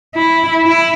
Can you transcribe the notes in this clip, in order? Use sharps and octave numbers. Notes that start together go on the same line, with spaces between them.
E4
E4